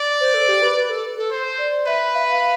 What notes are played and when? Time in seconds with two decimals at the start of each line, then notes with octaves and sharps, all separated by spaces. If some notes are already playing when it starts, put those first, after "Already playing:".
Already playing: D5
0.20 C5
0.34 A4
0.48 G4
0.62 B4
0.75 B4
0.89 A4
1.16 A4
1.31 C5
1.58 D5
1.86 B4 E5
2.14 F5
2.31 F5